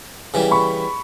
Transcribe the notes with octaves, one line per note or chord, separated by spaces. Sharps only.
C#3 E3 G3
B5 C#6